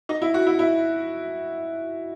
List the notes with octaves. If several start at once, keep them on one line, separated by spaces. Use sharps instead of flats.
D#4
E4
F#4
E4
E4